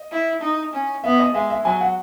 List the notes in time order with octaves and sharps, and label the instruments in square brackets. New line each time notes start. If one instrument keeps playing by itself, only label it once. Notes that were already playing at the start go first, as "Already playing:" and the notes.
Already playing: [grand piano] D#5
[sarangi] E4
D#4
C#4
[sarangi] B3 [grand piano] E5
[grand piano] D#5
[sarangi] G#3 [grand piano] E5
[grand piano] E5
[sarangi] F#3 [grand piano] G#5
[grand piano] F#5